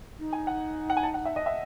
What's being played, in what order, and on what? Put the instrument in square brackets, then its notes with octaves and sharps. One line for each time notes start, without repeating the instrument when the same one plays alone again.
[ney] D#4
[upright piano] G#5
F#5
F#5
G#5
A5
F#5
E5
D#5
E5